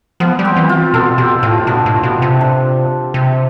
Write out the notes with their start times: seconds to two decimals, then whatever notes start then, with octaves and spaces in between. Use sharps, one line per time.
0.20 F3 B3
0.39 G3
0.45 C4
0.56 E3
0.69 F4
0.94 B2 A4
1.18 B2 G4
1.43 A2 F4
1.67 B2 D4
1.86 A2
2.03 B2
2.22 C3
2.41 D4
3.14 C3